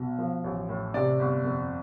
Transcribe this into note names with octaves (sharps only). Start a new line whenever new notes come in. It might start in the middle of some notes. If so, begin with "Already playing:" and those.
Already playing: B1 B2
F3
A1
A2
C3 D5
G1
F2